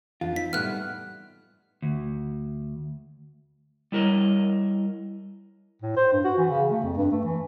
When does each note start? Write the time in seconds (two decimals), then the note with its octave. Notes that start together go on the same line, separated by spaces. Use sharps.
0.21 F2 E3 D4 F4
0.36 C4 D#4 B6
0.53 A2 C3 E3 G3 A3 B3 F6 F#6
1.82 D2
3.92 G3 E4 A#4 C#5 D#5
5.82 A2
5.97 C5
6.13 G2
6.24 F#4
6.38 E3
6.50 C#3
6.70 A3
6.83 F2
6.97 G2
7.12 A3
7.25 E3